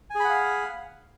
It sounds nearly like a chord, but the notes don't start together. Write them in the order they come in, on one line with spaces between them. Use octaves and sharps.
G#5 G#4 B5 F#5 F5